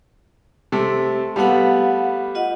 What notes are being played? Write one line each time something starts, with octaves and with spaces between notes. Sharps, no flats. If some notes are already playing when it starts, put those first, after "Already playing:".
C3 A3
G3 A3 B3 F5 F#5
F4 D#5 F#5